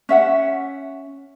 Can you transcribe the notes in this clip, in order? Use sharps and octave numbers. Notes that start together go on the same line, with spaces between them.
C#4 E5 F#5